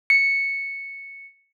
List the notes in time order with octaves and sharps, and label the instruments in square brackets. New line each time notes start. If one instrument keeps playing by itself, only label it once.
[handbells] C#7